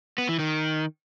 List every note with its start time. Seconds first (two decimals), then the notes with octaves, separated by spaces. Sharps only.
0.18 B3
0.29 E3
0.39 D#3